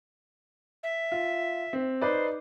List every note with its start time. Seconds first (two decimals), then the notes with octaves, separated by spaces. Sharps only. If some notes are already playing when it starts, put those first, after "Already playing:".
0.83 E5
1.12 F4
1.73 C4
2.02 D#4 B4 C5 D5